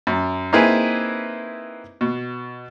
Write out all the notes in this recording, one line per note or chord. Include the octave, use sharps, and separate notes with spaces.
F#2
A#3 C4 D#4 E4 G#4 B4
B2